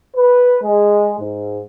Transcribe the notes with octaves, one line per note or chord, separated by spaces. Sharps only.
B4
G#3
G#2